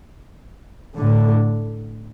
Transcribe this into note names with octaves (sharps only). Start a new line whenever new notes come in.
A2 D3